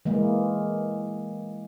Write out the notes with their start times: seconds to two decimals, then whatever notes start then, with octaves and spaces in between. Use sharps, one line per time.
0.05 E3 G#3 A#3